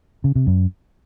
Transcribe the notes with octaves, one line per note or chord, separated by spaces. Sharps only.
C#3
C3
F#2